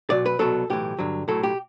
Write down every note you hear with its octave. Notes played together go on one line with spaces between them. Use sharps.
B1 B2 F#3 D5
B4
C2 B2 F#3 A4
B1 A2 E3 G4
G2 D3 F#3
B1 A2 F#3 A4
G4